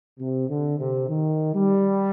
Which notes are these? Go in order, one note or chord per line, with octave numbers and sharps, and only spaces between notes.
C3
D3
C3
D#3
G3